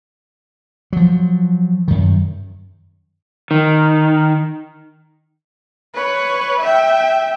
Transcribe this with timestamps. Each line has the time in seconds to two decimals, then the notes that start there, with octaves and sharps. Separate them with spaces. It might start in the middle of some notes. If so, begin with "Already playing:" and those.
0.93 F3 F#3
1.88 F#2 D#3
3.51 D#3
5.94 B4 C#5
6.60 E5 G5